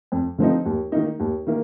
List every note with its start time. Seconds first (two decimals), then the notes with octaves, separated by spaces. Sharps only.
0.12 F2
0.38 D3 F3 C4 D#4
0.66 D#2
0.92 D#3 A#3 D#4
1.20 D#2
1.47 D#3 A#3